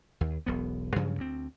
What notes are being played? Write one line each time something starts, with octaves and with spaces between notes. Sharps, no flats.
D#2
E1 B1 B3
G2 C#3 F3 F#3
D2 C4